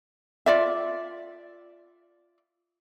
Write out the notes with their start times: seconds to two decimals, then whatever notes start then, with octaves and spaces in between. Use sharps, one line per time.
0.46 F4 D5 E5